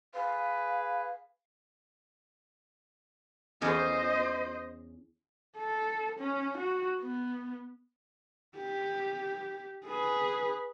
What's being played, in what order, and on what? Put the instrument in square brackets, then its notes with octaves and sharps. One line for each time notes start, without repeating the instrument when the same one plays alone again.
[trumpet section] G#4 B4 [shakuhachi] F5
[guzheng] E2 C#4 A4 [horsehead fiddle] C5 D#5
[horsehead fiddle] A4
C#4
F#4
B3
G4
G#4 B4